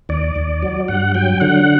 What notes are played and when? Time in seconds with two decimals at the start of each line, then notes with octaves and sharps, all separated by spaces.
0.09 D#2 D5
0.36 D#2
0.63 F#3
0.88 G2 F#5
1.15 F#3 G5
1.40 D3 F#5